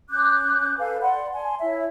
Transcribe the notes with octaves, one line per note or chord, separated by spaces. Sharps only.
C#4 D6 F#6 G6
A4 B4 F5 G#5
D5 F#5 B5 C6
G#5 A5 C6
E4 C#5 E5